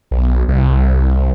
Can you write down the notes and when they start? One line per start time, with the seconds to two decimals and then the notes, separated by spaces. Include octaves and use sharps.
0.11 B1
0.48 C2